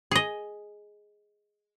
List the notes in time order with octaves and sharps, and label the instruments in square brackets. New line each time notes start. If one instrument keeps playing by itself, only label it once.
[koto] G#4 D#5